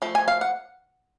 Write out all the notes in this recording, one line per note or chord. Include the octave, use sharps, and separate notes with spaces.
F3 A3
G#5
F5
F#5